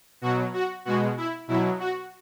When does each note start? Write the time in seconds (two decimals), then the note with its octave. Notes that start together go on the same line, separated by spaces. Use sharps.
0.22 B2 F#3 F#4
0.54 F#4
0.85 B2 G#3 F#4
1.17 E4
1.48 B2 F#3 E4
1.80 F#4